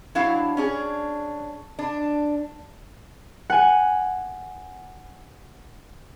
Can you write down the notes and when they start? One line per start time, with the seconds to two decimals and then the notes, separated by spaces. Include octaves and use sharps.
0.15 F#3 D4 E4 F5
0.57 C#4 D4 G#4
1.79 D4
3.50 F#5 G#5